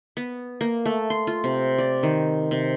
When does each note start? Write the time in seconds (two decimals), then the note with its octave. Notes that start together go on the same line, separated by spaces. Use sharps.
0.17 B3
0.61 A#3
0.85 A3
1.10 C6
1.27 F4
1.44 C3
1.78 D5
2.03 D#3
2.51 C3